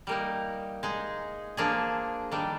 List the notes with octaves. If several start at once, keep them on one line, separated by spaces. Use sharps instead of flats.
G3 A#3 D#4 A#4
G#3 D#4 G#4
F3 A#3 D4 G#4
D#3 G3 D4